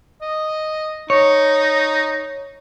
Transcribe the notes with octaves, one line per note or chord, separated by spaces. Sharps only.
D#5
D#4 C#5